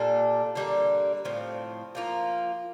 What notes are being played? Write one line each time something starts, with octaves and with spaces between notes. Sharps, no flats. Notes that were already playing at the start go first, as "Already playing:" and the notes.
Already playing: A#2 G3 D4 A4
D3 G3 A#3
A2 F3 C4
F3 A#3 F4